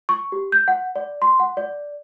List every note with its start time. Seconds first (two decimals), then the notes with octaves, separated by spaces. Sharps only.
0.09 C#6
0.32 G4
0.52 G6
0.68 F#5
0.96 D5
1.22 C6
1.40 F#5
1.57 D5